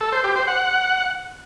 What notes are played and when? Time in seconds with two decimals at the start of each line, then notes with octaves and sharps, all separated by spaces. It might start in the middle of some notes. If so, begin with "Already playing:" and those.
0.01 A4
0.12 C5
0.24 G4
0.36 C5
0.48 F#5